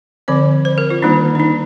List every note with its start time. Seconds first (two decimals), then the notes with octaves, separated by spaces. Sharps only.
0.28 D3 F3 C4 D5
0.65 C5
0.78 A#4
0.90 F4
1.02 D#3 G3 A#3 D4 D#4
1.35 D4
1.40 D#4